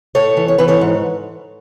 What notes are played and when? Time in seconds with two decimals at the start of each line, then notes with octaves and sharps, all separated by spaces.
0.15 A2 A4 C#5
0.37 E3
0.48 C#5
0.58 E3 B4
0.68 A4 C#5
0.81 G#2